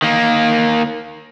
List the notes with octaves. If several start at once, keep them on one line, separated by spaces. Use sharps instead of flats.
D#3 A#3